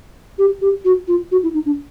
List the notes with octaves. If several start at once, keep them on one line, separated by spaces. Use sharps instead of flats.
G4
G4
F#4
F4
F#4
E4
D#4
D4